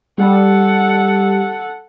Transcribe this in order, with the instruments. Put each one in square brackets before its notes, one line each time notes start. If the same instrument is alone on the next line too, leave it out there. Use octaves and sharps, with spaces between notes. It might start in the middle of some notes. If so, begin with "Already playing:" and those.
[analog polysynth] G3 [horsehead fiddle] A4 F#5